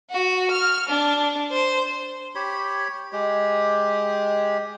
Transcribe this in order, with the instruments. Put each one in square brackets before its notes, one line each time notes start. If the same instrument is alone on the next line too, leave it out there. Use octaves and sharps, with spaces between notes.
[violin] F#4
F6
D4
C5
[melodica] G4 C#5 B5
G#3 G4